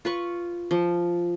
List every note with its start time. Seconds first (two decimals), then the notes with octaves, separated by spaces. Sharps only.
0.05 F4 B4 C#6
0.71 F3